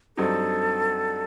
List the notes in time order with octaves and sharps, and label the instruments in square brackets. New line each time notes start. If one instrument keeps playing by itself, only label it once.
[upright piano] G2 F#3 C4 D#4 [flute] A4